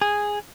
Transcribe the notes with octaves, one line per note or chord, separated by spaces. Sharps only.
G#4